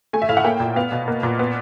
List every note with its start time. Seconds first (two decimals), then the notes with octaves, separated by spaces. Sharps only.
0.13 A3 G#5
0.22 E5
0.29 A2 F5
0.37 F#5
0.44 A#3 G5
0.60 A#2
0.76 B3 F5
0.92 B2
1.08 A#3
1.23 A#2
1.39 B3